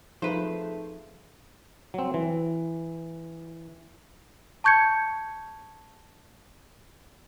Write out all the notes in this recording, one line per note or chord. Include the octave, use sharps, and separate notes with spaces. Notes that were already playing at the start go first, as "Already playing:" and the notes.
F3 A3 D#4 G#4 B4 C5 F5
F#3 C4
E3
A5 C#6 G6 G#6 C#7